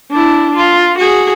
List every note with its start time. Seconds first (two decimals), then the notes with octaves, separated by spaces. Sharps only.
0.11 D4 E4
0.56 F4
0.98 F#4 G#4